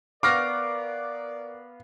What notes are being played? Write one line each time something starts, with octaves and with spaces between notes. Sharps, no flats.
B3 A#4 D5 F5 C#6 D6 F6 A#6